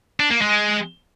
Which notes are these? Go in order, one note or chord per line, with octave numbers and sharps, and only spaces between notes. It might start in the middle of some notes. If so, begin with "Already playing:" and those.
D4
A#3
G#3